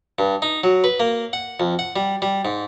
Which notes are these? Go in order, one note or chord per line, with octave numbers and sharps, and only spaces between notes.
G2
D#4
F#3
B4
A#3
F#5
F2
F#5
G3
G3
G#2